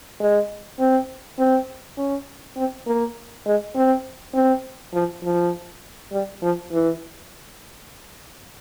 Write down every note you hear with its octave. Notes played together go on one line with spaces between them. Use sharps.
G#3
C4
C4
C#4
C4
A#3
G#3
C4
C4
F3
F3
G3
F3
E3